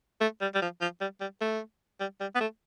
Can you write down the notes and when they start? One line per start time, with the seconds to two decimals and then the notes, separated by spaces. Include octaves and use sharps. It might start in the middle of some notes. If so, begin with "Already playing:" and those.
0.21 A3
0.41 G3
0.54 G3
0.62 F3
0.81 F3
1.01 G3
1.20 G3
1.41 A3
2.00 G3
2.20 G3
2.35 B3
2.40 A3